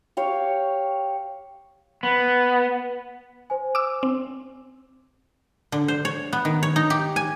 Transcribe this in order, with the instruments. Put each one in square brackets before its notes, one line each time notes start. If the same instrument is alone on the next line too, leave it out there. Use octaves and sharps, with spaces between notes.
[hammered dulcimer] G4 C#5 F5
[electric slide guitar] B3
[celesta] C5 G#5
[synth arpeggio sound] D6 E6
C4
[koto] D3
C5
C#5
B3
D#3
C#5
D#4
G4
G#5